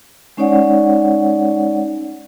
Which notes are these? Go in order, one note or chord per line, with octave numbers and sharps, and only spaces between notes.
G#3 C#4 D#4 C#5 D5 F#5